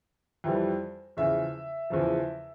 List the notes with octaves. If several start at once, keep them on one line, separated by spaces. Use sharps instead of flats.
F2 E3 G3
E2 C#3 F3 E5
E2 C#3 F3